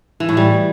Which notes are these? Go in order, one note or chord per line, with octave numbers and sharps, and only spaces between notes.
E3
A2
G3